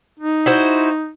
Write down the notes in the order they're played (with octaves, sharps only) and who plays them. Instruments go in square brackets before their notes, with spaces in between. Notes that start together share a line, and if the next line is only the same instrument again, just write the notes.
[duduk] D#4
[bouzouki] E4 F#4 C5